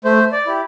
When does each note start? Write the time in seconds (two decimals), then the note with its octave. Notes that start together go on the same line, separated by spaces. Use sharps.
0.05 A3 C5
0.32 D5
0.47 E4 G4